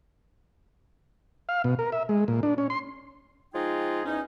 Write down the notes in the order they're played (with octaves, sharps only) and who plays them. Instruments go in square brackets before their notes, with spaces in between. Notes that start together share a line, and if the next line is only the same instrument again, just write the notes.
[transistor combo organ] F5
B2
A#4
E5
G#3
A#2
D4
C#4
C6
[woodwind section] F3 G#3 D#4 F4 G#4 G5
E2 C#4 D#4